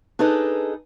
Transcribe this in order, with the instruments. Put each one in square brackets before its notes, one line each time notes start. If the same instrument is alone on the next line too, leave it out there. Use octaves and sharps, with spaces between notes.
[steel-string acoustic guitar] D4 D#4 G#4 A4 B4 D#5